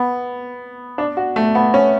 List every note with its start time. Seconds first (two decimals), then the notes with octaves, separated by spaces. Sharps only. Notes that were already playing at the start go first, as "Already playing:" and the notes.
Already playing: B3
0.98 D4
1.17 F#4
1.36 A3
1.55 B3
1.74 C#4